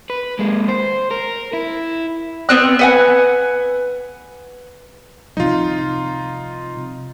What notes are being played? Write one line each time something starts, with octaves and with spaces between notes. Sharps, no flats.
B4
G#3 A#3
C5
A#4
E4
B3 C4 F#6
B4 F#5 G#5
C3 F3 G3 D#4 F4